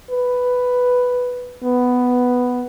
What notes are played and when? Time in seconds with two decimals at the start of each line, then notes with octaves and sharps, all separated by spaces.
0.10 B4
1.64 B3